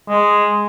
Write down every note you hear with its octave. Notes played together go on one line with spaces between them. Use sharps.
G#3